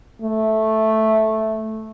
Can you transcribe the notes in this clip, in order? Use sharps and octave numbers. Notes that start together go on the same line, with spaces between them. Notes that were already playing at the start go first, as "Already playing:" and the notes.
A3